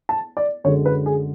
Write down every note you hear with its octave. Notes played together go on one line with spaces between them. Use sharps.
A5
D5
F#2 D3 G#3 C#5
B4
G#4